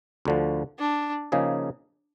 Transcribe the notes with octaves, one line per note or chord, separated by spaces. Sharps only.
D2 D3 F3
D4
C#3 F3 A#3 D#4 G#4